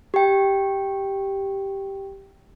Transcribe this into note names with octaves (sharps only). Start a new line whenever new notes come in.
G4 G5